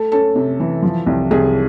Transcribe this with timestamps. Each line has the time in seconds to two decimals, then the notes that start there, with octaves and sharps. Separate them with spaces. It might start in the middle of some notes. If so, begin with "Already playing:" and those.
Already playing: A3 A4
0.12 C#4 A4
0.35 C3
0.60 E3
0.82 F3
1.07 C2
1.31 C2 G#4